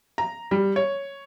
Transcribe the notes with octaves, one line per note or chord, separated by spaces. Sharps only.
A#5
G3
C#5